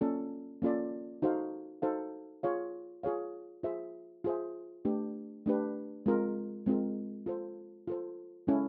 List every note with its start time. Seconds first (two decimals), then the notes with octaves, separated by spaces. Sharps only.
0.01 A#3 C#4 F4 A4 D5
0.62 A#3 C#4 F4 A4 D5
1.22 D#4 F#4 A4 C5 F5
1.82 D#4 F#4 A4 C5 F5
2.43 F4 G#4 C#5 F5
3.03 F4 G#4 C#5 F5
3.63 F4 G#4 C5 E5
4.24 F4 G#4 C5 E5
4.85 A3 D4 G4 B4
5.46 A3 D4 G4 B4
6.06 G#3 C4 F4 A#4
6.66 G#3 C4 F4 A#4
7.26 F4 A4 C5
7.87 F4 A4 C5
8.47 G#3 C#4 E4 A4